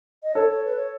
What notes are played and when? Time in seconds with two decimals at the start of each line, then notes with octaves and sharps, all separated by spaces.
0.23 D#5
0.34 A4 C#5
0.49 C#5
0.65 B4
0.77 C#5